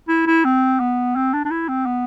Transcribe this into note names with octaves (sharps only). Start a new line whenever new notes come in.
E4
E4
C4
B3
C4
D4
D4
E4
C4
B3